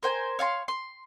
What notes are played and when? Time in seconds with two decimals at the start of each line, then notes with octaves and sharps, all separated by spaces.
0.03 A#4 C5 G5 G#5
0.39 C#5 F5 A5 C6
0.68 C6